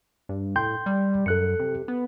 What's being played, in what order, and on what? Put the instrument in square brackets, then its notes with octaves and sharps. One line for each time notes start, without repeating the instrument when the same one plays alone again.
[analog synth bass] G2
[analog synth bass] A2 [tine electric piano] G5 C6 G6
[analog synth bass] G3
[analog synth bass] F#2 [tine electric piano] A4 F#6 C#7
[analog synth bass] C3
B3